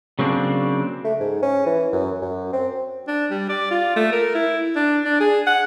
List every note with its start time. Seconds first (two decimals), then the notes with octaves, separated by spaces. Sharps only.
0.19 C#3 F#3 A#3 C4 D4
1.04 A3
1.20 G#2
1.42 C#4
1.66 E3
1.93 F#2
2.22 F#2
2.53 C4
3.08 D4
3.30 G3
3.49 D5
3.71 F4
3.96 A3
4.12 A#4
4.35 E4
4.76 D4
5.05 D4
5.20 G#4
5.47 F#5